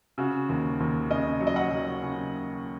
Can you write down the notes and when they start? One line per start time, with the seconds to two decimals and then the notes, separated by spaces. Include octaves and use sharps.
0.18 C#3 F#4
0.49 D#2
0.80 D#2
1.10 C#3 D#5
1.40 F#3
1.47 D#5
1.56 F#5
1.71 F#3
2.02 C#3